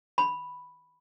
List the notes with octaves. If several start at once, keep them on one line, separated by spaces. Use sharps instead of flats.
B5